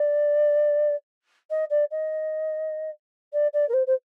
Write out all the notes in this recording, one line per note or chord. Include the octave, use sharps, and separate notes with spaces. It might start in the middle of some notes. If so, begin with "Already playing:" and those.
Already playing: D5
D#5
D5
D#5
D5
D5
A#4
C5
C5